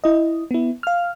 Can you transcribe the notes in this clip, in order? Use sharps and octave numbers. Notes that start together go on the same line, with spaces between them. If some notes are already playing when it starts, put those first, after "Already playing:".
E4 D#5
B3 E4
F5 F6